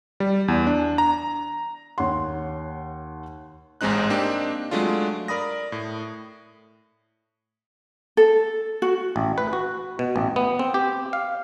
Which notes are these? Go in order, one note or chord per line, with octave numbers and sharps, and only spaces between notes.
G3
E2
D4
A#5
D#2 C#5 F#5 C6
A1 G#2 G#3 C4 D#4 F#6
A#3 C4 D4 D#4 G4
F#3 G#3 A3 D4 F4
A#4 D5 B5 D#6 A#6
A2
A4
F#4
A1
B4
F#4
B2
A1
B3
C4
G4
F5